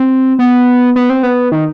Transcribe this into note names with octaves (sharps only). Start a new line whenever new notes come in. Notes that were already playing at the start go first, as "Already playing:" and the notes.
Already playing: C4
B3
B3
C4
B3
D#3